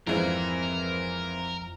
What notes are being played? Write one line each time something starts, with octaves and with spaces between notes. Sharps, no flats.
F2 G#2 E3 C4 E4 A#4